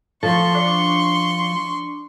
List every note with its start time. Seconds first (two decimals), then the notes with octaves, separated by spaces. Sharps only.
0.23 F3 A4 C6 C#6
0.55 D4